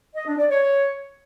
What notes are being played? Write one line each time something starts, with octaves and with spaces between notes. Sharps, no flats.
D#5
D4
D5
C#5